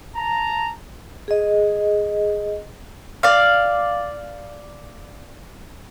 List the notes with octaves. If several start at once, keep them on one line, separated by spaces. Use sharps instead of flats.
A5 A#5
G#4 D#5
D5 F5